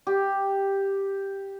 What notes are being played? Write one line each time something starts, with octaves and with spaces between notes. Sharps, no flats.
G4